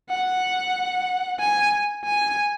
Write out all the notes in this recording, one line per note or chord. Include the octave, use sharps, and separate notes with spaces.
F#5
G#5
G#5